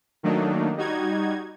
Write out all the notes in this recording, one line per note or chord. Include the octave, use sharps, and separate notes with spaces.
D#3 F#3 A3 A#3 D4 D#4
G3 D#4 F#4 G#6